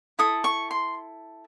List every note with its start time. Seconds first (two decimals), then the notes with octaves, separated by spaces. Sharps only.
0.19 E4 A4 D#6
0.44 C#6
0.71 C6